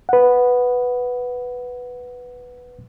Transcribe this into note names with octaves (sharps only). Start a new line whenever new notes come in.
B4 F#5